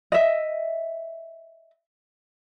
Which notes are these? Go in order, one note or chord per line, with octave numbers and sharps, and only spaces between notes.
D#5 E5